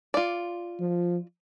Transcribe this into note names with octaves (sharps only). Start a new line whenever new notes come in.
F4 D5
F3